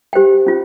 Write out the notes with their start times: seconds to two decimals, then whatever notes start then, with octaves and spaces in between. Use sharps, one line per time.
0.13 G4 C5 G5
0.46 C#4 F4